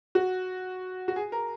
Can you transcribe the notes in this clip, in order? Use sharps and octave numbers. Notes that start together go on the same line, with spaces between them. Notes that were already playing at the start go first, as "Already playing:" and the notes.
F#4
F#4
G#4
A#4